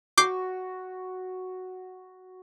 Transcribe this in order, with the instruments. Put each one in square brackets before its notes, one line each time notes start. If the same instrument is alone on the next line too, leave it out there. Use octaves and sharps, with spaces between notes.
[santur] F#4 C#6 [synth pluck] D6 G6 C7